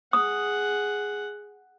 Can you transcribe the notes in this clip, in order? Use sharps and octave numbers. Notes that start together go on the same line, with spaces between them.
G#4 F#5 D#6